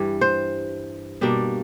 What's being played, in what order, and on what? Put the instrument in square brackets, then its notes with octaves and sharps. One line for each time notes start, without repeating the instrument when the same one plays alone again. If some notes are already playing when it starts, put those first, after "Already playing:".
Already playing: [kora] G2 E3 G3
C5
B2 G3 A#3 D4